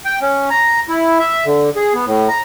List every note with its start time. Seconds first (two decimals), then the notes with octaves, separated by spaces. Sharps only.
0.05 G5
0.22 C#4
0.51 A#5
0.89 E4
1.19 E5
1.46 D3
1.76 G#4
1.94 B3
2.07 A2
2.29 A#5